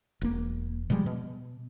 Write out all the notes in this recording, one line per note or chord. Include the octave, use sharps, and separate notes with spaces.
E1 A#3
B2 F3 G3 G#3
B2